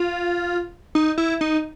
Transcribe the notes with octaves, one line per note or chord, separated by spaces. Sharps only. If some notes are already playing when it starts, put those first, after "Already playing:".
Already playing: F4
D#4
E4
D#4